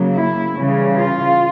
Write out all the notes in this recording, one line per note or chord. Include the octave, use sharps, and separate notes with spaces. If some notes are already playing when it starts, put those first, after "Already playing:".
Already playing: C#3 F#3 A#3
E4
C#3 E3 G3
F4